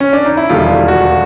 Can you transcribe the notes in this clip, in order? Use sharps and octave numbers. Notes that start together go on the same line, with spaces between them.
C#4
D4
D#4
E4
E1 D#2 D3 G3 F4
F#4